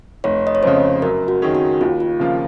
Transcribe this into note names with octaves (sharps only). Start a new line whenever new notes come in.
F1 C#5
D#5
C#5
F2 C#3 C5
F#2 A#4
F#4
D#3 F#3 C#4 G#4
F#4
D#2 F4
F4
C#3 F3 A#3 F4